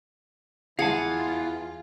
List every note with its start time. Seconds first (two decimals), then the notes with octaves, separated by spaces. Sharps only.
0.79 E2 E3 F4 G#4 F5 F#5 A5